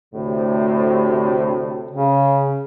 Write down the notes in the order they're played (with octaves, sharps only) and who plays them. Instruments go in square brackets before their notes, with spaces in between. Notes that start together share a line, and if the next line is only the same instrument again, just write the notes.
[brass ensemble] D2 A2 C3
[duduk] C#3